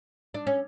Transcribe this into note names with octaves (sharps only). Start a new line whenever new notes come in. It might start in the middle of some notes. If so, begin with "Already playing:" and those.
D4
C#4